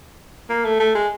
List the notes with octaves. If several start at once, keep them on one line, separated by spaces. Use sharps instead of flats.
A#3
A3
A3
G#3